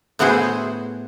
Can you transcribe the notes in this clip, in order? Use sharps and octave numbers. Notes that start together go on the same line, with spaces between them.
A2 B3 E4 F#4 G#4 C5